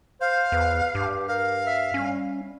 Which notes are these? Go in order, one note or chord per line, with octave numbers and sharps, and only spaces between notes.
C5 F5
E2 B4
G2 G4
A#4 F5
E5
G3 C#4